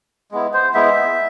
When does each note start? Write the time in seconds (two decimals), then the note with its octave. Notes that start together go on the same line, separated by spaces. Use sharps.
0.32 G#3 B3 E4
0.53 C5
0.74 G#3 B3 E4 E5